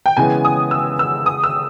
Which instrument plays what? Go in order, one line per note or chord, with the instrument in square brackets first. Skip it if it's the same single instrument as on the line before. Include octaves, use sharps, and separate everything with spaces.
[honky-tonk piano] G5
[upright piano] C#3 E3 G#3 B3 [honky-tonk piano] G#5
[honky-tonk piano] D#6
E6
E6
D#6
E6